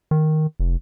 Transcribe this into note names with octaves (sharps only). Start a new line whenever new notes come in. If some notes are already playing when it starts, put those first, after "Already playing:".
D#3
F1